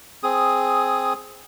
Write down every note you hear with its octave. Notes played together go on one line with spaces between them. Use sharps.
C4 G#4 D#6